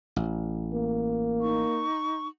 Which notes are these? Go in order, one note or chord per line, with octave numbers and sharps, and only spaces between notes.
A1
A#3
D#4 C#6